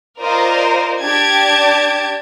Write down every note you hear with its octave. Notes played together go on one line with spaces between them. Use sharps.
F4 A#4 C5 D5 D#5
D4 G4 A5 G#6 D7